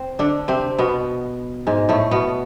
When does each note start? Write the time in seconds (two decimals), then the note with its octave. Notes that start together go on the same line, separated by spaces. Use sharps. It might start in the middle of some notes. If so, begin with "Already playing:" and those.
Already playing: C4
0.19 D3 D4
0.48 C3 C4
0.79 B2 B3
1.67 G#2 G#3
1.89 A2 A3
2.11 B2 B3